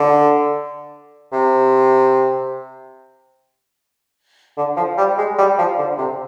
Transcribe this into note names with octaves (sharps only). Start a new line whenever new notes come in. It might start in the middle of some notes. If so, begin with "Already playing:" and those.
Already playing: D3
C3
D3
F3
G3
G#3
G3
F3
D3
C3